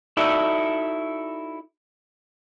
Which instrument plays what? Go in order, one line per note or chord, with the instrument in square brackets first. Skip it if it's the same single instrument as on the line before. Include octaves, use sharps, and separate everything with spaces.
[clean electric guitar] D#4 E4 F#4 A4 D5 E5